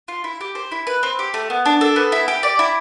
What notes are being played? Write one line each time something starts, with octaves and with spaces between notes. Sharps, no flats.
F4
E4
G4
C5
E4
B4
C4
G4
A3
B3
D4
A4
B3
E4
G4
D5
E4